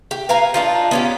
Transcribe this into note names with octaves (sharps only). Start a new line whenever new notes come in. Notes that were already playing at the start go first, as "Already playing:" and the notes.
G4
B4 F5 G#5 A#5
D4 D#4 F4
B3 C#4 G4